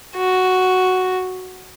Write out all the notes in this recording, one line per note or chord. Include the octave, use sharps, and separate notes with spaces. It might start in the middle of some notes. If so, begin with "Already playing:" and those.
F#4